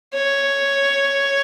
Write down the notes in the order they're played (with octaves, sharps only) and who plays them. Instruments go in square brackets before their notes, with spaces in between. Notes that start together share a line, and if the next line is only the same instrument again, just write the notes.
[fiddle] C#5